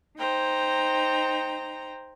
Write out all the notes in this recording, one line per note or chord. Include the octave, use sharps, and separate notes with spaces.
D#4 C5 G5 A#5